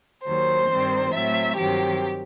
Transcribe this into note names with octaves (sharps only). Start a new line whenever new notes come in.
D#2 D#3 F#3 C5
G2 D#3 G3 C4
A2 F#3 A3 C4 E5
G2 D#3 F#3 C4 G4